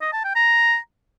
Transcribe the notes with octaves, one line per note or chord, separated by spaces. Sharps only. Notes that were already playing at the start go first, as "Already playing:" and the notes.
D#5
A5
G5
A#5